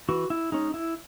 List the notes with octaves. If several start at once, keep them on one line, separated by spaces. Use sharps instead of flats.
E3 F#4
E4
G#3 C#4 D#4
E4